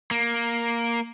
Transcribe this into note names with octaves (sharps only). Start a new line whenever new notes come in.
A#3